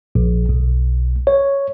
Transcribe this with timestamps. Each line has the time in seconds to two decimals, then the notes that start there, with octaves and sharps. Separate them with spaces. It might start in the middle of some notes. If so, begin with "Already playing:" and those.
0.15 A#1
0.49 B1
1.27 C#5